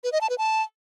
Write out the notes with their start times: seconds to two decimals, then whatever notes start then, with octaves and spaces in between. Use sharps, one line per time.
0.04 B4
0.12 D#5
0.21 A5
0.30 B4
0.38 A5